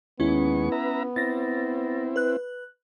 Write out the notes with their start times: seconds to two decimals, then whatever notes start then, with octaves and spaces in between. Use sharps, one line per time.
0.20 D#2 G#3 B3 C#4 E4 C#6
0.72 B4 E5 A#5
1.16 C4 E4 A6 A#6
2.16 B4 F#6